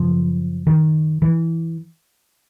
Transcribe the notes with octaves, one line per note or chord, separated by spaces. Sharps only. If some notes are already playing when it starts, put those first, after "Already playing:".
Already playing: F#2 C#3 F3
D#3
E3